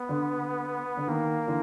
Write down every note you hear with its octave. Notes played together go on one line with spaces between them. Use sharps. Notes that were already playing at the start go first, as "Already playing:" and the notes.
Already playing: B3
D3
D3
D#3 A#3
D3 E3